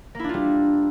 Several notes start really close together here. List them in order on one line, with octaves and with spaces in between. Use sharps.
A#3 E4 D4 F4 G3